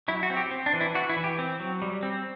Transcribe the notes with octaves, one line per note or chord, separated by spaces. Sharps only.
F#3 E4
F#4
C4
G4
C4
D4
E3
E4
E3 F#4
E4
E3
G4
C4
F#3
G3
C4